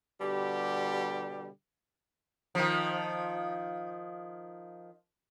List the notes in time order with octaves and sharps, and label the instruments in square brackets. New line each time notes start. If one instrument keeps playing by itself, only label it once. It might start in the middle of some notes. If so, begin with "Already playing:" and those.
[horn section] B2 D3 G3 G4
[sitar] D#3 F3